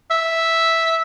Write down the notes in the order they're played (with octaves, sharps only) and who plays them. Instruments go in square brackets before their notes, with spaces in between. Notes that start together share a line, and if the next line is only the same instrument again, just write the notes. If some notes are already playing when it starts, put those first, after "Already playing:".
[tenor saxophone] E5